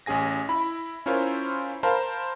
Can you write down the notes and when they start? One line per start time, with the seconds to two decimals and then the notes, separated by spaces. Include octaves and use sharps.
0.06 A1 C#4 G#4 G#5 A#6
0.49 E4 B5
1.06 C#4 E4 F4 A#4 C5 C#5
1.83 A#4 C5 F5 A5 B5